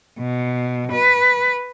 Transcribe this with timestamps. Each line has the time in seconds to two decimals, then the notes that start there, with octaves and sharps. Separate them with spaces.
0.19 B2
0.91 B4